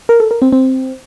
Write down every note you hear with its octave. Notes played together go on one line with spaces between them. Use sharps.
A#4
A4
A#4
C4
C4